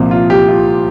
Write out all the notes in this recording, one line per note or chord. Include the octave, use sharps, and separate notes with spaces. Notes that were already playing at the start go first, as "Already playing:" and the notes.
Already playing: C2 A#2 F3
F4
G4
F4